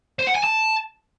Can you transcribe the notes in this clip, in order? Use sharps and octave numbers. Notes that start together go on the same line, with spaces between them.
C5
F#5
G#5
A5